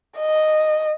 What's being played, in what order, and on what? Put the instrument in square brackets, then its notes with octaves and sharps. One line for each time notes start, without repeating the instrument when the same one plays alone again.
[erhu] D#5